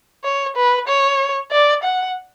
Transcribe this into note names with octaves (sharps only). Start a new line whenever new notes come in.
C#5
B4
C#5
D5
F#5